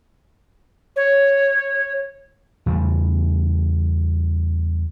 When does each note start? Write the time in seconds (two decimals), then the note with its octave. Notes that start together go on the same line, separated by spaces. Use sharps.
0.96 C#5
2.66 E2 C#3 G3